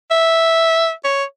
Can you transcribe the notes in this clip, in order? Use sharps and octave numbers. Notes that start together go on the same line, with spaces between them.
E5
C#5